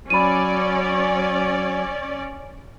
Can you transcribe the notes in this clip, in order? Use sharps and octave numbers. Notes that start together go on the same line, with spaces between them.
F#3 C#4 D5 B5 D#7